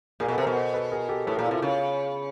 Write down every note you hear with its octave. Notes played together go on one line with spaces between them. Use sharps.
A#2 G#4 A#4
B2 A4 B4
C3
B2 A#4 C5
A#4 C5
A4 B4
G#4 A#4
G4 A4
A2 A4 B4
A#2 G#4 A#4
E4
C3 F4
C#3